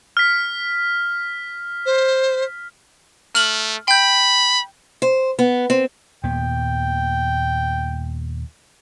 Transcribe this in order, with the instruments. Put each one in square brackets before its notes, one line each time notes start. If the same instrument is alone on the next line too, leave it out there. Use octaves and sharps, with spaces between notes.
[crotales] F6 B6
[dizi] C5
[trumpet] A3 [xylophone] F6 F#7
[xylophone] G5 G6 [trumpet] B5
[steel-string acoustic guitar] C5
B3
C4
[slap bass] D#2 A#2 B3 [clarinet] G5